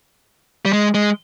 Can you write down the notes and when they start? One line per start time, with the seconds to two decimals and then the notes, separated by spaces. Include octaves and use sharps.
0.65 G3
0.73 G#3
0.94 G#3